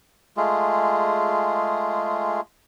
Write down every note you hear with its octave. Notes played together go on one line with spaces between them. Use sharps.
G#3 A3 F4 G#4